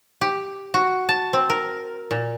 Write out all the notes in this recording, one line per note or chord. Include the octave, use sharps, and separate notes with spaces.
G4
F#4
A5
C4
A#4
A#2